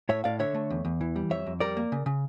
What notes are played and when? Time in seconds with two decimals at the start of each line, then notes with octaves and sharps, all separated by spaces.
0.09 A2 C#5 E5
0.24 A2 D5 F5
0.39 D3 C#5 E5
0.54 A3
0.70 E2
0.85 E2
1.01 E3
1.16 G3
1.30 F2 C#5 E5
1.46 F2
1.60 G3 A#4 D5
1.77 A#3
1.92 C#3
2.06 C#3